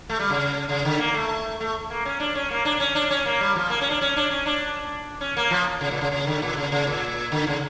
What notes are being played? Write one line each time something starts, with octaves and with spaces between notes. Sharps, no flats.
A3
G3
C#3
C#3
D3
A#3
A3
A3
A#3
C#4
D4
C#4
A#3
D4
C#4
D4
C#4
A#3
G3
F3
A#3
C#4
D4
C#4
D4
C#4
D4
C#4
A#3
F3
C#3
A#2
C#3
C#3
D3
A#2
C#3
C#3
A#2
D3
C#3